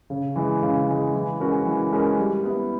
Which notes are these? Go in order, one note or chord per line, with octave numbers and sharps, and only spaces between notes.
C#3
E3 G#3
C#3
E3 G#3
E3
G#3 C#4 F#4 A#4
E3
G#3 C#4 F#4 A#4
G3
B3 E4